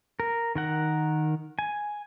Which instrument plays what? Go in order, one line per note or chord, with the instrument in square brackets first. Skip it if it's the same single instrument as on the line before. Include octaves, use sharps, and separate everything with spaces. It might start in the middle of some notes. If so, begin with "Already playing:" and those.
[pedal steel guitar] A#4
D#3 A#4 F#5
G#5